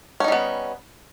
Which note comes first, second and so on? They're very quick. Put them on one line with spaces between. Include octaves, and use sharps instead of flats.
C#4 D#4 G3 B3